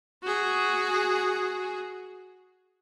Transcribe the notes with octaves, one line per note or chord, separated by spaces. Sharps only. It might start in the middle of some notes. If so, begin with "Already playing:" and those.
F#4 G#4